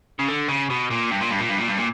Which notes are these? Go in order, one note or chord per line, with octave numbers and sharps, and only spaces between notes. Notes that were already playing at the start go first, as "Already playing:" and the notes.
C#3
D3
C#3
B2
A#2
G2
A#2
G2
A#2
G2
A#2
G2
A#2